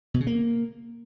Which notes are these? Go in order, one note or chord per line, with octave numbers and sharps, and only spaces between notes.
B2
C#3
A#3